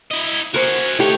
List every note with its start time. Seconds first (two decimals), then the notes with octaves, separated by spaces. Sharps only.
0.11 E4 D#5
0.54 F#4 G#4 A#4 C5
0.99 D#3 A3 G4 C#5